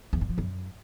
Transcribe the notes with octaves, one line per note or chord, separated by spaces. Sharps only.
E2
G2
F3
F#2